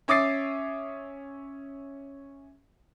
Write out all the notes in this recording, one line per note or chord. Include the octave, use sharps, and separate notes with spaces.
C#4 E5 D6 D#6 A6 C7